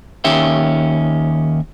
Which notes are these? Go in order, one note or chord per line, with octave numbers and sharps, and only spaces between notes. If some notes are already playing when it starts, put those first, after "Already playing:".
D#2 D#3 C#4 G4 E5